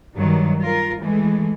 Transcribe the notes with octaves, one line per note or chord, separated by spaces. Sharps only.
G2 D#3 F#3
F4 A#4
E3 G#3 A3